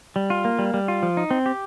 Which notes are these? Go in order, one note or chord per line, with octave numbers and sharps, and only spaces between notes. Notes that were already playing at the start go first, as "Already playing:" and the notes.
G3
F4
A#3
G3
G3
F4
F3
D#4
C4
G4